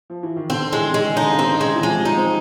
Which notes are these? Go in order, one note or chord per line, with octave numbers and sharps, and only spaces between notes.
F3
E3
D#3
D3 C4
E3 G#3
D#3 G#3
D3 D#4
C#3
C3 C4
G#3
E3
F3 G#3
G3
D#4
C4